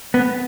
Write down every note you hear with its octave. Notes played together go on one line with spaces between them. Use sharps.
B3